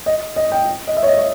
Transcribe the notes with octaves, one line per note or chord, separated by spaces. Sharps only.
D#5
D#5
G5
D#5
E5
C#5
D#5
C#5